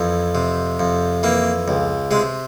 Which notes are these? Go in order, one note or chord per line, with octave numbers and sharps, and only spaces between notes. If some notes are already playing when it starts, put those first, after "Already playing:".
Already playing: F2 E3
C3
F2
E3 A#3
C#2
C3 G#3